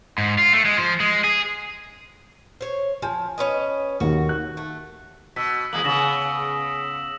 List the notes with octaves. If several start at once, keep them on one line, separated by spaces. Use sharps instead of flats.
G#2
F4
A3
G#3
F3
G#3
G#4
C5 C#5
F3 G#5
C#4 B4 D#5
D#2 D#3 F#4
F#6
A3
B2 E6 B6
E2 G#3 A#3 D#6 F#7
C#3 B3 A#6 E7